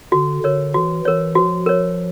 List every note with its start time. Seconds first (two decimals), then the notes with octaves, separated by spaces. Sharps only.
0.12 D3 F#4
0.43 D3 A#4 C#5
0.74 E3 F#4
1.05 E3 A#4 C#5
1.35 F3 F#4
1.66 A#4 C#5